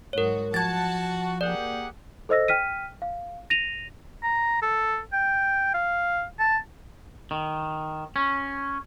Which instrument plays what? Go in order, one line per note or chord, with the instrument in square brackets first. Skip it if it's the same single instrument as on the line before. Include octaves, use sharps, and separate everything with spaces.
[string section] G#2 F#3 F#4 [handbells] A#4 C#5
[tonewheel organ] F3 [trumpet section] F#4 F#5 [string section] A5 [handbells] G#6 A6
[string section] A#3 [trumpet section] G4 G#4 F#5 [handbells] D5
[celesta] A4 C5 D#5 E6 A#6
G5 F6 B6 D#7
F5
A#6 D#7 F7
[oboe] A#5
A4
G5
F5
A5
[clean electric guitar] D#3
C#4